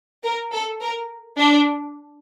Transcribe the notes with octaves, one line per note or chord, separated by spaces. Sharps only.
A#4
A4
A#4
D4